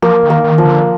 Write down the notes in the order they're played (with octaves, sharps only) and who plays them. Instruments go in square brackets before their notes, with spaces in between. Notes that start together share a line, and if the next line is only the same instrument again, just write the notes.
[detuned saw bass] F3 [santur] A#3
[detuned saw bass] D#3
[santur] A#3
[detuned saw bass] D#3
[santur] F3
[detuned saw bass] D3